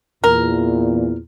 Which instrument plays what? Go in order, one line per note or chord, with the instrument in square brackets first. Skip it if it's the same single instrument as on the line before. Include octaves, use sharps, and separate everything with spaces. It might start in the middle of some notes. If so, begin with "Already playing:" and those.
[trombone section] E2 A#2 [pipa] A#4